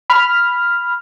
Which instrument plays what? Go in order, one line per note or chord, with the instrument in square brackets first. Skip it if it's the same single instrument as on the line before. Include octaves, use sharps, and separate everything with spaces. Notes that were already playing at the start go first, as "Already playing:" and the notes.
[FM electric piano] B5 F6